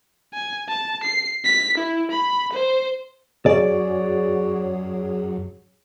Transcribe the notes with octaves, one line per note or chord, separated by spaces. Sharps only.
G#5
A5
C7
B6
E4
B5
C5
F#2 F#4 G#4 C#5 D5